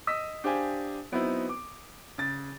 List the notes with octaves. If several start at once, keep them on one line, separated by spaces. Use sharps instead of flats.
D#5 D#6 E6 B6
D4 G4 C5 F5 G#5
F#3 B3 C4 D#4 E4 C5
D6
C#3 A6